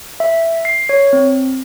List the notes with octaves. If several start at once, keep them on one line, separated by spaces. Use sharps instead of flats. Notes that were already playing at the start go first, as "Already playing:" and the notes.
E5
C7
C#5
C4